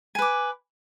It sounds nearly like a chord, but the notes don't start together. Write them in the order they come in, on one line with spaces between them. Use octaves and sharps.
G#5 B4 D6